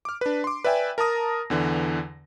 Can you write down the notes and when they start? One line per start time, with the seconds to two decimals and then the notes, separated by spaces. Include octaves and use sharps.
0.05 D6 F6
0.21 D4 B4
0.44 C6 D6
0.64 B4 D5 E5 G5 G#5
0.98 A#4 A5 A#5 D#6 A#6
1.50 E2 D3 E3